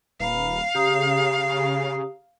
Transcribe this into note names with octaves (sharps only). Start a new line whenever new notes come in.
D#1 B4 F5 A#5 B5
C#3 G4 A#5 D#6